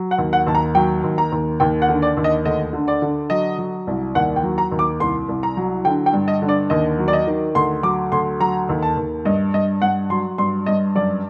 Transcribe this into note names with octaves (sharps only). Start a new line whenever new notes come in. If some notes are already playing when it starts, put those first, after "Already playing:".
Already playing: F#3
F#5
D#2
F#5
D#2 A5
A#5
F#3 G5
D#2
A#5
D#2
D#2 G5
F#5
D3
D5
D#2
D#5
D2 D#5
D3
D5
D3
F#3 D#5
F#3
C2
D#2 F#5
G5
F#3
A#5
D#2
D6
C2 C6
C2
A#5
F#3
D3 G5
G5
G2
D#5
D3
D5
D#2 D#5
F#3
D5
D#5
D#3
D2 C6
F#3 D6
D2 C6
F#3 A#5
D#2
A5
D#2
G2 D#5
G2 D#5
G2 F#5
F#3 C6
G2 C6
G2 D#5
F#2 D5